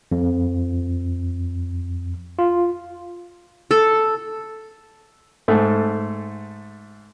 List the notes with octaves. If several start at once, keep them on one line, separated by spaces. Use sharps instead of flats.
F2
F4
A4
G#2 A3